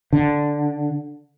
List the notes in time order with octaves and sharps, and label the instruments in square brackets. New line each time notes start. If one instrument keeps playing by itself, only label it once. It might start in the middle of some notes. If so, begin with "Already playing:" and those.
[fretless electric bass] D3